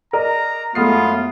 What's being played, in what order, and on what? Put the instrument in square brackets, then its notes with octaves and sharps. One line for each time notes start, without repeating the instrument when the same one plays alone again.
[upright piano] A#4 D5 D#5 [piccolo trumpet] A#5
[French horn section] F#2 A3 [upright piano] G#3 D#6 C7 [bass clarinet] B3 [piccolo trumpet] F4